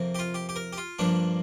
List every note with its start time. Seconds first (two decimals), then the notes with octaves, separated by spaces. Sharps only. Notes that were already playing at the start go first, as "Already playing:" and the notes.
Already playing: F2 C3 A#3
0.15 G4
0.19 F4
0.34 G4
0.49 G4
0.56 A#4
0.73 G4
0.77 F4
0.99 G2 F3 A#3 D4